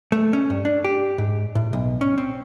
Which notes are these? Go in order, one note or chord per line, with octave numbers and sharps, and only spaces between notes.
A3
C#4
G2
D4
G4
G#2
A2
B1
C#4
C4